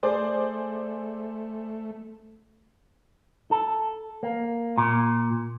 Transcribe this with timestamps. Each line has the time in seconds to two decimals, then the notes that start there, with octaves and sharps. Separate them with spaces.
0.03 A3 G#4 C5 D5
3.51 A4
4.23 A#3
4.78 A#2